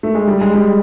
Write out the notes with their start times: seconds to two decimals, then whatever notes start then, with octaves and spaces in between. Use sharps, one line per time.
0.03 A3
0.15 G#3
0.27 G3
0.41 G#3
0.54 G3